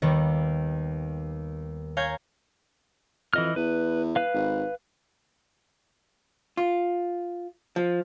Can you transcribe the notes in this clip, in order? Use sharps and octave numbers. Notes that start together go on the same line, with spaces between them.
D#2 D#3 G3 B3
C#5 F5 G#5 A#5 G6 G#6
F2 E3 D#5 F6
E2 B4
B4 F5
G#1
F4
F3